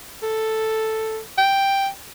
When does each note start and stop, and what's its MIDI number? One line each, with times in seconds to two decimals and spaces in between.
0.23 1.20 69
1.38 1.88 79